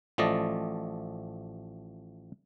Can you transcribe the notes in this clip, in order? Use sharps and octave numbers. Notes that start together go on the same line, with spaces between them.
A1 F3 A3 D5 D#5